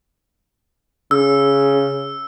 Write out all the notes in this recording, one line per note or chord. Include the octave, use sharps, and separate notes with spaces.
C#3 E6